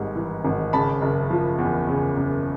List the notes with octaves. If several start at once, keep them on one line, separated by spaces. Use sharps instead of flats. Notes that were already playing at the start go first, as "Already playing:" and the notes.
Already playing: G#1 G#2 G3
E3
G#1
C#3 A5 B5
F#1
F3
E2
C#3
F#1